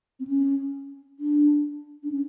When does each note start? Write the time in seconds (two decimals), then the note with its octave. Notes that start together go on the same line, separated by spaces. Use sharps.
0.20 C4
0.27 C#4
1.19 D4
2.03 D4
2.11 C#4